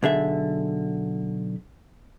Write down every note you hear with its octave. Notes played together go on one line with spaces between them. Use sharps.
B1 D3 G#4 E5